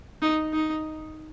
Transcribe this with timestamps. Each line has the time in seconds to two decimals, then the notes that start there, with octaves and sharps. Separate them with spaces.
0.22 D#4
0.53 D#4